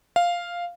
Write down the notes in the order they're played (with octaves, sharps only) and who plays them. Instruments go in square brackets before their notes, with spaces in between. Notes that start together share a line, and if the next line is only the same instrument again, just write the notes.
[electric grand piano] F5